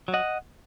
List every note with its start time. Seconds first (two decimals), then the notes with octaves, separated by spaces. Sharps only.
0.08 F#3
0.14 D#5 F#5